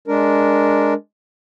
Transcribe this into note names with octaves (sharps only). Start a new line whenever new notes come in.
G#3 D4 A#4